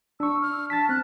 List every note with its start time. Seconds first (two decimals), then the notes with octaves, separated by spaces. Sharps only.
0.20 D4 C#6 E6
0.42 F6
0.70 A5 A6 B6
0.89 C4 F#6